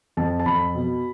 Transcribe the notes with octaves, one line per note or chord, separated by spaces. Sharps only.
F2 A5
A5
F2 B5
B2